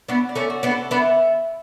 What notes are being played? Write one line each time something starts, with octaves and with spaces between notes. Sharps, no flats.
B3 D4 F#4
D5
A3 C#4
F#4
B3 D4
A4
B3 D4 E4